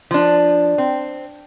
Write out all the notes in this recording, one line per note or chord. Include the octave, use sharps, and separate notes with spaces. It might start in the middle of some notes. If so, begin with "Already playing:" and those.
F3 D4
C4